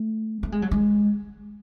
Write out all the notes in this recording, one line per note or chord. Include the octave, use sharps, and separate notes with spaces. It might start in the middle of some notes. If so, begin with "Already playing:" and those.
Already playing: A3
A3
G#3
F#3
G#3